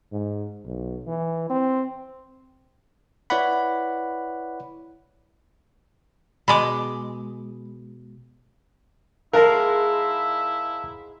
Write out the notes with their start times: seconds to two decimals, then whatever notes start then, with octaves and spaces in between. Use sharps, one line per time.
0.12 G#2
0.65 B1
1.07 E3
1.50 C4
3.30 E4 B4 C#5 D5 F#5 B5
6.48 B2 G#3 B5 D6
9.33 G#2 G#3 E4 A#4 F5 A5 A#5